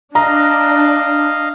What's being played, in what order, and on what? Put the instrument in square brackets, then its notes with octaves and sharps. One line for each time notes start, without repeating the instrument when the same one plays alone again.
[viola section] D4 [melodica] D#5 F5 [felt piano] A#5